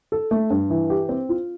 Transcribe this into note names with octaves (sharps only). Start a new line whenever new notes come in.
A4
A3
G2
E3
G4
C4
F4